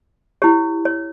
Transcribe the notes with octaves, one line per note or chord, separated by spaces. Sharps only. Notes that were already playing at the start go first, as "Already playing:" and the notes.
E4 G4 C#5
C#5